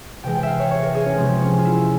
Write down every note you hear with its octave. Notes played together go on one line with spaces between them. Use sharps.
C3 E3 G#3 G5
G5
E5 F5
C#5
C#5
A#4
G#4
C#4
C3 F3 G#3 C4
C#4
F4
E4